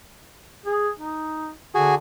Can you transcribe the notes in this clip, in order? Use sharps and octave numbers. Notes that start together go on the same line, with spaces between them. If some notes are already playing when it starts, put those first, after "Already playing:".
G#4
D#4
D3 F#4 G#4 G#5